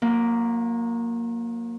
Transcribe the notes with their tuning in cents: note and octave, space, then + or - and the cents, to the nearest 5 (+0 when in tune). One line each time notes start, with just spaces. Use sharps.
F#3 -40 A#3 +0